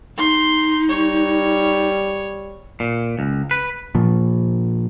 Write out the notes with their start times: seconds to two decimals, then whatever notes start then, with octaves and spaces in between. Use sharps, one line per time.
0.17 D#4 C6
0.89 G3 C#5
2.80 A#2
3.19 C#2
3.51 B4
3.95 A#2 F3